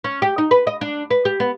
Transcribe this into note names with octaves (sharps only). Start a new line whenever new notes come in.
C#4
G4
D#4
B4
D#5
D4
B4
G4
B3